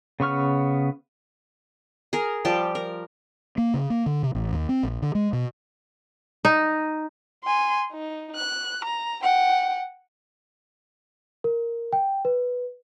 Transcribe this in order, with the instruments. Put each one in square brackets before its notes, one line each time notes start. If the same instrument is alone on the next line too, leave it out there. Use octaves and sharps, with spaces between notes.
[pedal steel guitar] C#3 B3 C#6 F6
[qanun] G#4 A#4
F3 G3 G4 A5
A#4
[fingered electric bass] A#3
C#3
A#3
D3
C3
A1
D#2
C4
A#1
D3
G#3
B2
[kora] D#4
[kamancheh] G#5 C6
D#4
F#6
A#5
F#5 G5
[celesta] A#4
G5
B4